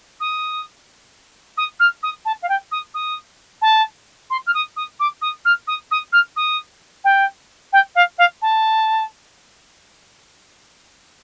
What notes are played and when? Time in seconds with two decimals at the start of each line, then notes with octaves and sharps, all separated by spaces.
0.20 D#6
1.57 D#6
1.80 F6
2.03 D#6
2.25 A5
2.42 F5
2.49 G5
2.71 D#6
2.94 D#6
3.62 A5
4.30 C6
4.47 F6
4.54 D#6
4.76 D#6
5.00 D6
5.21 D#6
5.45 F6
5.67 D#6
5.91 D#6
6.12 F6
6.36 D#6
7.04 G5
7.73 G5
7.95 F5
8.18 F5
8.42 A5